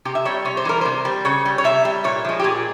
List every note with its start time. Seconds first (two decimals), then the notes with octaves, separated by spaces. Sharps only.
0.05 C3 G4
0.15 E5
0.25 G3 C#5
0.45 C3 C#5
0.57 C5
0.65 E3 G3 A#4
0.81 C3 C5
1.05 G3
1.25 C#3 C#5
1.45 G3
1.58 C#5
1.64 C3 E5
1.85 G3
2.04 A#2 C#5
2.25 F3 G#3
2.40 G4
2.44 A#2 G#4